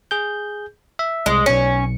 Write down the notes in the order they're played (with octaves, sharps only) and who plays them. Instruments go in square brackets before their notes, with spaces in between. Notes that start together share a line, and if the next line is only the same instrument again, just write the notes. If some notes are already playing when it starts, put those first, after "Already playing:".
[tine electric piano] G#4 G6
E5
[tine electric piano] C2 [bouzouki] G#3
[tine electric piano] B1 C#7 [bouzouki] C#4